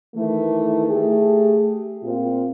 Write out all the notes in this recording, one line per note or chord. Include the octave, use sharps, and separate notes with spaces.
D#3 E3 A3
A3 G4 G#4
A#2 C4 F4